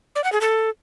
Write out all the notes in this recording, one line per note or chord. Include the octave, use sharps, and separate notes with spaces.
D5
F#5
G#4
A4